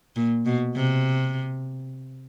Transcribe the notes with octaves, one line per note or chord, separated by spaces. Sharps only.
A#2
B2
C3